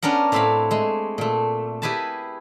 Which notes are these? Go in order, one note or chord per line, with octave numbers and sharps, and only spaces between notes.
B3 C#4 D4 A#4 F#5
A2 A3 C4 E4 F5 B5
G#3 A3
A#2 A3
E4 G4 G#4 B4 G#5 A5